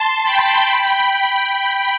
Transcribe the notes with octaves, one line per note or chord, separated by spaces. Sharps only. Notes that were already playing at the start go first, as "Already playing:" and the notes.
Already playing: A5 C6
G5 B5
G5 B5